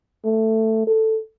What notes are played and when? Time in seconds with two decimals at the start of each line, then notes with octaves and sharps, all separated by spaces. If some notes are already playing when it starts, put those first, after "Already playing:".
0.25 A3
0.87 A4